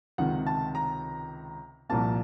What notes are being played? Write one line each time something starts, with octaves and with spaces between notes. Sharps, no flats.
C#2 C3 D#3 F#5
A5
A#5
C2 A#2 F3 A#3 A5